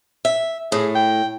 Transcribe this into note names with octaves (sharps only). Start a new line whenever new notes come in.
E5
A2 G#4
G5